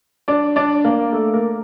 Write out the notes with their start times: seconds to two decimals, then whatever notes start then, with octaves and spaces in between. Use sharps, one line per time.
0.28 D4 D5
0.56 D4 D5
0.84 A#3 A#4
1.12 A3 A4
1.34 A#3 A#4